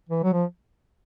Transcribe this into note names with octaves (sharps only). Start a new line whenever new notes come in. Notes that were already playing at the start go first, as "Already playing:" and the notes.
E3
F#3
F3